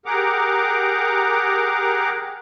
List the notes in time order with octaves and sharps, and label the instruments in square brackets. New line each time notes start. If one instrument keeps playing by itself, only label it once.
[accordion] G4 G#4 A#4 F#5 A#5 D6